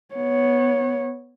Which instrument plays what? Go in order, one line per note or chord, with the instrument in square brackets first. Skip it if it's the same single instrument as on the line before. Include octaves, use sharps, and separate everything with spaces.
[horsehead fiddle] B3 C#5